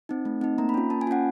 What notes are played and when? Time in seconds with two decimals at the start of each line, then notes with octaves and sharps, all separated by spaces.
0.09 C4 D#4
0.25 A3
0.41 C4 D#4
0.58 A#3 A#5
0.69 B5
0.74 C#4 F4
0.90 A#3 A5
1.01 G#5
1.07 C#4 F4 F#5